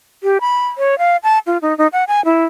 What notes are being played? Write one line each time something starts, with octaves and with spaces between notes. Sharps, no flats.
G4
B5
C#5
F5
A5
F4
D#4
D#4
F#5
G#5
E4